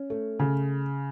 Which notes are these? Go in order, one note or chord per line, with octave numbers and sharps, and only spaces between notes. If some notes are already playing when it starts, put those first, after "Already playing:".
Already playing: C#4
A3
C#3